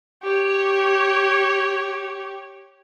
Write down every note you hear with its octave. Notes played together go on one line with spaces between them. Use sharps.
G4 C#5